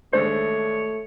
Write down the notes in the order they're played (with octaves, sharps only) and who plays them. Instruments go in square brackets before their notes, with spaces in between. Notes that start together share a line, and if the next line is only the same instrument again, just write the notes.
[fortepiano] D#2 G#3 D4 [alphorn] A3 [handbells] C5 [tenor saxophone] C#5